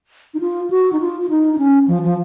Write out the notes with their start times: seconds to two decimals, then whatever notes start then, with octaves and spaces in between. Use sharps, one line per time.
0.34 D#4
0.40 F4
0.70 F#4
0.93 D#4
1.00 F4
1.21 F4
1.30 D#4
1.53 D#4
1.58 C#4
1.88 F3
2.03 F3